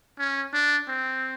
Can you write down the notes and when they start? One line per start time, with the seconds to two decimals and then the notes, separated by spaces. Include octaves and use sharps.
0.19 C#4
0.53 D4
0.88 C4